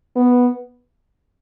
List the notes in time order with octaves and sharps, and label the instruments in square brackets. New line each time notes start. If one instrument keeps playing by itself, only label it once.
[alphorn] B3